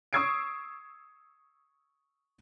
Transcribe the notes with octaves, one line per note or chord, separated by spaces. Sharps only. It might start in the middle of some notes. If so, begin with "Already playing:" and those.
C#6 D#6 E6 G#6 C7 D7